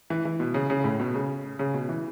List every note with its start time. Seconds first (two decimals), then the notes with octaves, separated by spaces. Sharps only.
0.10 E3
0.25 E3
0.40 B2
0.54 C#3
0.70 C#3
0.84 A2
1.00 B2
1.14 C#3
1.59 C#3
1.74 B2
1.89 E3